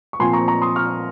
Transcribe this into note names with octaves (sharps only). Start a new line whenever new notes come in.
C#6
A#2 F3 C4 G#5 C6
A#5 C#6
A#5 C#6
C6 D#6
C#6 F6